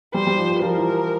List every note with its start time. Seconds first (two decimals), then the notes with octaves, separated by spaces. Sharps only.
0.14 G3 C5
0.27 G3
0.39 F3
0.50 F3
0.62 F3 A#4
0.78 E3